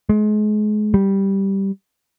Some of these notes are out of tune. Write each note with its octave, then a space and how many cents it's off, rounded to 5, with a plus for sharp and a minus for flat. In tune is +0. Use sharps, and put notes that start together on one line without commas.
G#3 +35
G3 -5